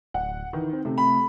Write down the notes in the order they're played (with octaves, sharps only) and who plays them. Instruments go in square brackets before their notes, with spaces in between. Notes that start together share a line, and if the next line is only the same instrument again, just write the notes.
[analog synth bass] D1 [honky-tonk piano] F#5
[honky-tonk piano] D#3 [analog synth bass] E3
[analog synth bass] C4
[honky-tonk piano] C3 [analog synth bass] A3
[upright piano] B5